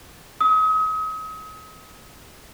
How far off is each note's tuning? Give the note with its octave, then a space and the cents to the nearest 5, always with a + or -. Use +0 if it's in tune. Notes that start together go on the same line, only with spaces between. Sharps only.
D#6 +40